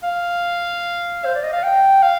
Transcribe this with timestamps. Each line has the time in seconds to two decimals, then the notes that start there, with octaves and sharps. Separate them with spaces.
0.03 F5
1.25 C5
1.35 D5
1.43 D#5
1.53 F5
1.63 G5
2.02 F5